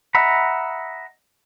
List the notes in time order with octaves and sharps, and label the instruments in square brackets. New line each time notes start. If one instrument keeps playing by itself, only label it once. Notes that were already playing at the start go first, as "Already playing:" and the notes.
[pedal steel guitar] D#5 E5 F#5 A#5 B5